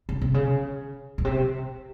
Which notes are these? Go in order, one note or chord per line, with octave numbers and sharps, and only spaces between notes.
C#3
C3
C#3
A#2
C3